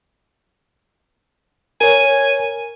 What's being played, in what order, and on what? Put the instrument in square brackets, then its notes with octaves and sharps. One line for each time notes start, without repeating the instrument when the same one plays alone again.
[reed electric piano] A#4 C#5 [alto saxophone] G#5